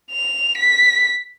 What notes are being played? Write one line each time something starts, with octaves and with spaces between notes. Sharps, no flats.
F7
B6